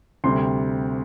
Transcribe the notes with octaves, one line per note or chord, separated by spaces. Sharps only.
D2 C3 G3 C6